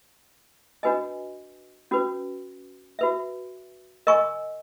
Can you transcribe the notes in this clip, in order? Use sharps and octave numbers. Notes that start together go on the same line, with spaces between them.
D4 F#4 B4 D#5 G#5
C#4 F#4 B4
F#4 B4 E5
A#4 D#5 G#5 C#6